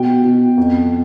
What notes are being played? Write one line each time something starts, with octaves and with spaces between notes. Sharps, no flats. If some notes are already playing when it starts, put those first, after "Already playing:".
Already playing: B2 G5
B2
F2